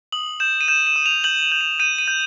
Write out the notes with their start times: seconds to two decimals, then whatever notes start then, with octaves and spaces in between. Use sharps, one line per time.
0.12 D#6 F#7
0.40 G6 E7
0.61 D#7
0.68 G6 E7
0.87 E7
0.96 D#6
1.06 F7
1.24 G6 F#7
1.43 F#7
1.52 G6
1.61 E7
1.80 G6 D#7
1.98 D#7
2.08 G6